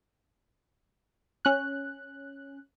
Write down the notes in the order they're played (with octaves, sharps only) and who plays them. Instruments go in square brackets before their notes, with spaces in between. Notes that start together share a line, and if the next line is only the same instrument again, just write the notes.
[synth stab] C#4 F#6